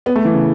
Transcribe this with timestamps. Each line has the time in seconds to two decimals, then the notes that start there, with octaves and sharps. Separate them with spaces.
0.06 B3
0.15 A3
0.25 E3
0.34 C#3